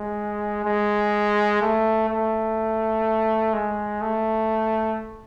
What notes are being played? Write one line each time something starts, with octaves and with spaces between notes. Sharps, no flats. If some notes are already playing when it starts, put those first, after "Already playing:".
Already playing: G#3
G#3
A3
A3
G#3
A3